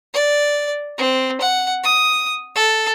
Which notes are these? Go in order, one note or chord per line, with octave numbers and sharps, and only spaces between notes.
D5
C4
F#5
D#6
A4